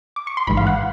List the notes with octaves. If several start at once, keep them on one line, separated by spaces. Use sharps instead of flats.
D6
C#6
C6
A1 G#2 E3 B5
F5
F#5